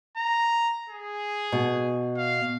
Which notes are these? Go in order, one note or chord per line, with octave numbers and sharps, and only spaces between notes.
A#5
G#4
B2
F5